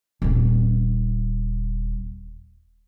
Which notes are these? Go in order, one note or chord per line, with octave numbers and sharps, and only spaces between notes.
D#1 C4